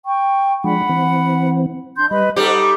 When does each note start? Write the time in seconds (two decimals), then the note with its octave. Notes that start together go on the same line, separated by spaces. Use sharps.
0.05 G5 C#6
0.64 F3 G#3 D4 F#5 B5
0.89 E3 C4
1.97 D4 C6 G6
2.11 G3 B4 D#5 B5
2.36 G3 D#4 G4 A4 C5 D#5 F#5